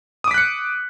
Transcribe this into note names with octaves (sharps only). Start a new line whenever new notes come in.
D6 D#6 F#6 B6 C#7